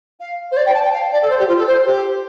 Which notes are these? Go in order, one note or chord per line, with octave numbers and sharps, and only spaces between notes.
F5
C5
D5
G5
A5
G5
F5
D5
A4
C5
G4
F4
A4
C5
G4